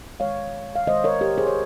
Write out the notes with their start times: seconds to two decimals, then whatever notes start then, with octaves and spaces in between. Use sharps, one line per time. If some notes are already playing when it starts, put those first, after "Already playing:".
0.20 D#3 G#3 C#5 F5
0.76 F5
0.87 D#3 G#3 C5 D#5
1.04 A#4 C#5
1.21 G4 A#4
1.38 G#4 C5
1.47 C#5